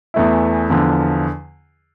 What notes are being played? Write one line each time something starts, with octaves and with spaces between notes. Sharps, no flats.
E2 E3 A3 E4
E2 D3 F3